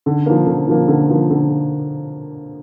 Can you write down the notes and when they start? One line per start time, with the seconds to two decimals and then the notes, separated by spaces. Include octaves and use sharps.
0.06 D3
0.26 F3 A#3
0.47 D3
0.68 F3 A#3
0.88 D3
1.09 F3 A#3
1.30 D3